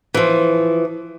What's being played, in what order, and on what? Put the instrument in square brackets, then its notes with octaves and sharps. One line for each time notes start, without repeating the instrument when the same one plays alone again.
[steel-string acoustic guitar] E3 F3